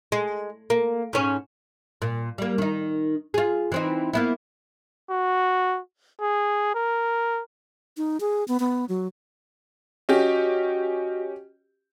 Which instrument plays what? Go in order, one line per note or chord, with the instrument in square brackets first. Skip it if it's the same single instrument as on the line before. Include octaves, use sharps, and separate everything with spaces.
[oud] G#3
A#3
G#2 C#4
A#2
G3 A#3
D#3 D#4
F4 G#4
E3 C4 D#4
A#3 B3 E4
[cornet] F#4
G#4
A#4
[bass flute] D#4
G#4
B3
B3
F#3
[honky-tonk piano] C#4 G4 [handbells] F#4 D#5